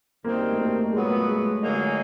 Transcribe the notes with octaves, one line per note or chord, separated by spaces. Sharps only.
F#2 D#3 G3 A#3 C4 D#4
A3
A#3
A#2 F#3 G#3 B3
A3
G#3
D3 F#3 A#3 D#4 G#4